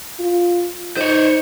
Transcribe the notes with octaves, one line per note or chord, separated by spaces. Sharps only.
F4
D#4 C5 C#5